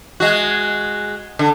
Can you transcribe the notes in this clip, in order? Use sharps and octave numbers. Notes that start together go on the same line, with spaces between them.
G#3 F#4
D3